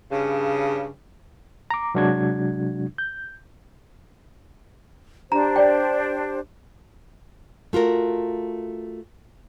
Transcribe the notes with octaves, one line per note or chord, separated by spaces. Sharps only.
G2 C#3
A#5 D6
C3 F#3 G#3 D4 F#4 G#6
G6
D4 G4 C5 A#5
D5 G5
A3 F4 F#4 A#4